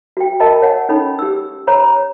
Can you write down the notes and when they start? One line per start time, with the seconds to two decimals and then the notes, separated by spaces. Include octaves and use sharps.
0.17 F#4 G5
0.40 A#4 D#5 A5 B5
0.62 C#5 F#5 G#5
0.89 C#4 D#4 A4 B5
1.19 G4 E6
1.67 C5 C#5 A#5 B5